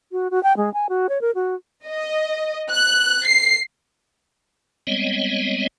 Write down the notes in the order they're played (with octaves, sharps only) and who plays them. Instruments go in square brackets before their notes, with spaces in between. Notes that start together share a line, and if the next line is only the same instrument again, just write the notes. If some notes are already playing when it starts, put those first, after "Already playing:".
[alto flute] F#4
F#4
G5
G#3
G#5
F#4
C#5
A#4
F#4
[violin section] D#5
F#6
C7
[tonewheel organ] G3 G#3 B3 C4 C#5 D#5